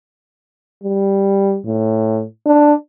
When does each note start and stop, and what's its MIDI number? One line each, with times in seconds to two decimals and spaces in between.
0.83 1.58 55
1.66 2.24 45
2.46 2.73 62